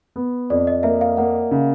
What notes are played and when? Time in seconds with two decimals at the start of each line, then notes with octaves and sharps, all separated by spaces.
0.16 B3
0.50 F2 D5
0.67 D#5
0.83 A#3 E5
1.01 F5
1.17 A#3 F#5
1.51 C#3